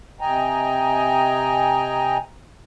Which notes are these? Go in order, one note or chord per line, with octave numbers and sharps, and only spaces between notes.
C3 D#5 G5 G#5 A#5